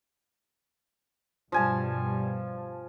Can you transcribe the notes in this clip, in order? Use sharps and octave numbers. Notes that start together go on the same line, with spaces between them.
G2 B2 F3 G3 G#5 A5